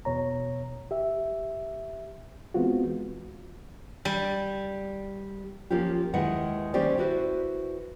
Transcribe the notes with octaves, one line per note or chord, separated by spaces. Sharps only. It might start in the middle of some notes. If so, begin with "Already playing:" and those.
E2 B2 C#5 A#5
G4 E5
E3 G#3 B3 C4 F4 F#4
G3
F3 A#3 C#4 F4 G4
D#2 D#3 G#3 E4 B4 F#5
G3 A#3 C#4 G4 C5 D5
E4 F#4 B4 C5